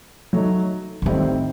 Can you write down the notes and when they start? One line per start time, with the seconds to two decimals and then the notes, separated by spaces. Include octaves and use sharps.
0.33 F#3 A3 D#4
1.02 D3
1.06 A2 D#3 G3 C4 D#4